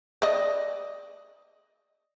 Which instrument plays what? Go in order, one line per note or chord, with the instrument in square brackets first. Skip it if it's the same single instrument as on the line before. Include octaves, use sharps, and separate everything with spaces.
[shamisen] D5 D#5